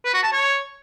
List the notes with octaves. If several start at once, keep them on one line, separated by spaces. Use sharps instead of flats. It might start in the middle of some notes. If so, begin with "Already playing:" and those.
B4
F#4
A5
C#5